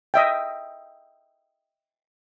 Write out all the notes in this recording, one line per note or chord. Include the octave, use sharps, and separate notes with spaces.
D#5 E5 G5